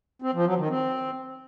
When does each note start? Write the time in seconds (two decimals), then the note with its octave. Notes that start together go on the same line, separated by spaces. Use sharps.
0.22 C4
0.34 F3
0.46 F#3
0.58 D#3
0.70 C4